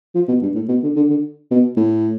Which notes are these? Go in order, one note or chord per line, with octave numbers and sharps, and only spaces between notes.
F3
B2
G2
A2
B2
D3
D3
D3
B2
A2